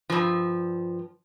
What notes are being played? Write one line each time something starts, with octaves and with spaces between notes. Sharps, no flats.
G2 F3